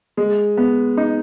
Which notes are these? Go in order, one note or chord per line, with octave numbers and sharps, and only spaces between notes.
G#3
B3
D#4